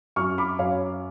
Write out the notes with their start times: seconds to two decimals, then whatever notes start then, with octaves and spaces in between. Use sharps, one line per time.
0.16 F#2 C#6 F6
0.38 B5 D6
0.59 F#2 C#5 F5